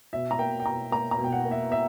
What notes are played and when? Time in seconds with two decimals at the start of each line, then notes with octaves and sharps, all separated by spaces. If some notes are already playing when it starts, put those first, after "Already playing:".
0.13 B2 E5
0.31 A#5
0.39 A#3 G5
0.60 G5
0.66 B2 A#5
0.92 A#3 A#5
1.11 A#5
1.18 B2
1.24 G5
1.32 F#5
1.45 A#3
1.51 E5
1.71 A#3 E5